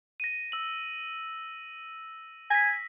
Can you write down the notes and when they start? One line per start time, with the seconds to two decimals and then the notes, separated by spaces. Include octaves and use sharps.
0.20 A#6 D#7
0.52 E6 F#7
2.51 G#5 A#6 B6